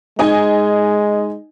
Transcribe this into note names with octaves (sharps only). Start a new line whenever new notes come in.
G#3 D#4 D#5 G#5